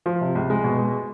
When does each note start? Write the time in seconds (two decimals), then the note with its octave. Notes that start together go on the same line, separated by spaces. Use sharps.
0.06 F3
0.21 C3
0.35 C#2
0.50 G#3
0.64 B2
0.78 G#3